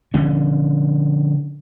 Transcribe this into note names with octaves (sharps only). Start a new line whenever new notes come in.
D3 F3 C#4